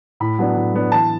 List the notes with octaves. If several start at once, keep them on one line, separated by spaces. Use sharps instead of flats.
A2 B5
F#3 B3 D4
A2
F#3 B3 D4
E3 A5